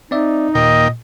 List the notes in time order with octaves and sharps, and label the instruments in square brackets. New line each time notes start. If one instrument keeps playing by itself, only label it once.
[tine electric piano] C4 D5 E5 [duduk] D#4
[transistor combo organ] D#2 A#3 G5 [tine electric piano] A#2 [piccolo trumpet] D#5